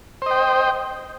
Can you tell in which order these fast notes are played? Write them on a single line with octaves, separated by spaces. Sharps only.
C5 D#5 G5